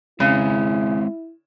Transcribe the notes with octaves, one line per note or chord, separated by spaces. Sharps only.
C#3 G#3 C4 E4 C#5